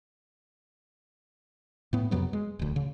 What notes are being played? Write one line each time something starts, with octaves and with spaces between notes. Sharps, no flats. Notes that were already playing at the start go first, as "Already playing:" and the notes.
A2 B3
F2 C3 F#3 B3
G#3
D1 D2
C#3